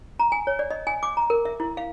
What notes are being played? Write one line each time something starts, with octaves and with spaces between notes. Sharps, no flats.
A#5
G#5
C#5
D5
D#5
G#5
D6
A#5
A#4
E5
E4
F5